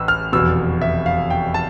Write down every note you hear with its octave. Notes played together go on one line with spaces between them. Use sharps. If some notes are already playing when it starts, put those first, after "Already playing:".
Already playing: A1 A2 E6
F6
F1 E2 B2 E6
E5
F5
G5
A5